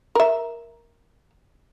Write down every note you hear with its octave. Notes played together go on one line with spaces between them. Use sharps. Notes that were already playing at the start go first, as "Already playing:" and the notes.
A#4 E5